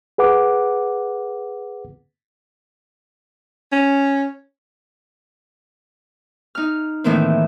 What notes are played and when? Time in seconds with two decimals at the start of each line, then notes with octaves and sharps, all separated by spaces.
0.18 G#4 B4 F#5 D6
3.72 C#4
6.55 D#4 F6
7.04 A2 D#3 E3 A#3 C4